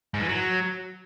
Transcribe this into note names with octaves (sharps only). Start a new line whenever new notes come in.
G#2
E3
F#3